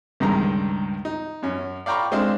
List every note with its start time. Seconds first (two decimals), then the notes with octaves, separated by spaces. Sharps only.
0.20 C#2 G2 D#3 G#3 A#5
1.05 D#4
1.43 F#2 C#4
1.86 D5 F5 G5 A#5 B5 C#6
2.11 G#3 C4 D4 D#5 F5